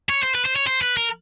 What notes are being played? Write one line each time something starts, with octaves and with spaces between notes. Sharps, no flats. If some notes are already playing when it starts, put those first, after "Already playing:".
C#5
C5
B4
C5
C#5
C5
B4
A#4